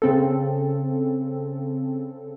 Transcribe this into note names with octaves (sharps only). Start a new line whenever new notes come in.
C#3 C4 A4